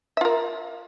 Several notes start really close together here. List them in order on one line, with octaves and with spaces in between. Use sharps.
E5 F4 A#4